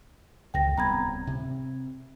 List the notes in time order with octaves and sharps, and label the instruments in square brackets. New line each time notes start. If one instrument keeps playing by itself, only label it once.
[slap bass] C#2 [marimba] G5 A#6
[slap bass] D1 C2 B3 [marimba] A#5 B5 G#6
[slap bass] C3